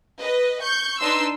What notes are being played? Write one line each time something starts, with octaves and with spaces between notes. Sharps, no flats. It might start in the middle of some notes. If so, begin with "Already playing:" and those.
B4 D#5
C#6 G6
D4 D#4 B4 C6 E6